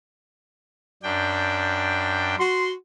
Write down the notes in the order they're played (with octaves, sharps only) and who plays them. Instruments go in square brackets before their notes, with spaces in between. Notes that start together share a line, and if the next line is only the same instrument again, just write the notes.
[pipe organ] F#2 D4 G5
[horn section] F#4 C6